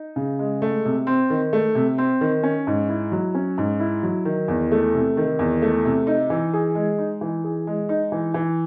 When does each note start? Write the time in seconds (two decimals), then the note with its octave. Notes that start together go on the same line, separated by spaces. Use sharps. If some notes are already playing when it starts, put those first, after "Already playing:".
Already playing: D#4
0.16 C#3
0.39 G#3
0.62 A3
0.85 C3
1.07 C4
1.30 D#3
1.53 A3
1.75 C3
1.98 C4
2.21 D#3
2.43 C#4
2.67 G#2
2.89 E4
3.12 F#3
3.35 C#4
3.58 G#2
3.80 E4
4.03 F#3
4.25 D#3
4.48 E2
4.72 A3
4.94 C3
5.17 D#3
5.39 E2
5.62 A3
5.85 C3
6.07 D#4
6.30 E3
6.53 G#4
6.75 G#3
6.98 D#4
7.21 E3
7.44 G#4
7.67 G#3
7.89 D#4
8.12 E3
8.34 E3